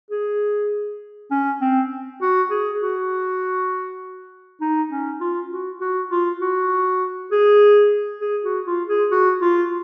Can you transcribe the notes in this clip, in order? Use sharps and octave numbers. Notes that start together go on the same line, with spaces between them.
G#4
C#4
C4
F#4
G#4
F#4
D#4
C#4
F4
F#4
F#4
F4
F#4
G#4
G#4
F#4
F4
G#4
F#4
F4